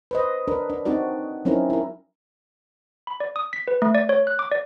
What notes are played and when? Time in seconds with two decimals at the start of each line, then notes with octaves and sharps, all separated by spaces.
0.11 B4 C5 D#5
0.48 D4 A#4 B4
0.70 D4
0.85 C4 D4 D#4 F#4 D5
1.45 F#3 C4 C#4 D#4 E4 A#4
1.70 E4 A#4
3.07 B5
3.20 D5
3.36 D#6
3.53 B6
3.68 B4
3.82 A3
3.95 D5
4.09 C#5
4.27 F#6
4.39 D6
4.52 D5